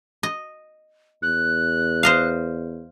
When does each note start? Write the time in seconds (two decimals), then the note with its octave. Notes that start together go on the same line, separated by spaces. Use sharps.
0.23 D#5
1.22 E2 F#6
2.03 C5 D#5 F5